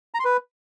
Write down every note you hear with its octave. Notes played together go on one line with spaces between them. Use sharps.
A#5
C6
B4